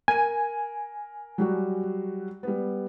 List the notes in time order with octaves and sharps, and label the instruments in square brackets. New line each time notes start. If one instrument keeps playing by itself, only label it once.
[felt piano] A#4 D#7 [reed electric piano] G#5
[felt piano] F#3 G3 F#4
G3 B3